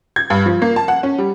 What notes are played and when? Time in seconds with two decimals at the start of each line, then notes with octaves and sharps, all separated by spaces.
0.16 G#6
0.30 G2
0.46 F3
0.62 A#3
0.76 A5
0.88 F#5
1.03 C#4
1.18 G3